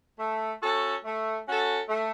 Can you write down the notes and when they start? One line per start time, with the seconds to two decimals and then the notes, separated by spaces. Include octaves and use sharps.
0.19 A3
0.62 C#4 F#4 A4
1.04 A3
1.46 C#4 F#4 A4
1.89 A3